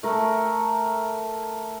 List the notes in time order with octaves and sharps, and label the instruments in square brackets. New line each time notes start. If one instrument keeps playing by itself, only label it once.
[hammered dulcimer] A3 A#4